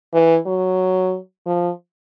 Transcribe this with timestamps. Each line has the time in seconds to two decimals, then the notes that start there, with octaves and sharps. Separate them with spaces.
0.13 E3
0.46 F#3
1.46 F3